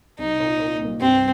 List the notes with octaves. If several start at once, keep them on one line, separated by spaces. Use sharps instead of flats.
C2 D#4
A#2
A#2
C2
G2 C4